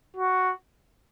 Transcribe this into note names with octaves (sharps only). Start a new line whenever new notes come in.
F#4